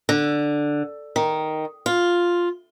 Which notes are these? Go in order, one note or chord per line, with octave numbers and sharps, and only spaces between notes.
D3
D#3
F4